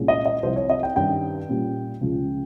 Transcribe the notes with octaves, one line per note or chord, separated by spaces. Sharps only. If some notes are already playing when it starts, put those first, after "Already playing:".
Already playing: C2 A#2 G#3 C#4
D#5
D#5
C2 C3 F3 C5
C#5
D#5
G5
G2 D#3 G3 C#4 G5
A#2 G3 C#4
C#2 C#3 F3